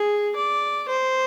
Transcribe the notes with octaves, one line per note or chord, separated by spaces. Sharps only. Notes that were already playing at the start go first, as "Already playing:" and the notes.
Already playing: G#4
D5
C5